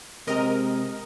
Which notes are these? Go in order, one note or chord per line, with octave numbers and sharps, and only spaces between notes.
C3 G#3 C4 A#4 D#5